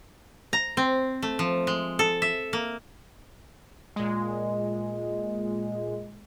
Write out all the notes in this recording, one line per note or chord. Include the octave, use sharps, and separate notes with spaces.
A#5
C4
A3
F3
G#3
A4
E5
A#3
A#2 G#3